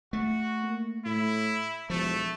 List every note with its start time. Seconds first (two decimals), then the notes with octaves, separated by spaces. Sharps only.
0.13 A3 F#4
0.63 A#3
1.05 A2 E4
1.90 E1 F3 A3